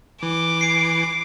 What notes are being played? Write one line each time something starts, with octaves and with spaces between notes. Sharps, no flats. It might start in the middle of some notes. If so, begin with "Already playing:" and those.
E3 D6
C7 D7